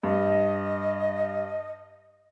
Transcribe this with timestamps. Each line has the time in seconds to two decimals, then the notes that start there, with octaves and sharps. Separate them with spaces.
0.03 G2 D#5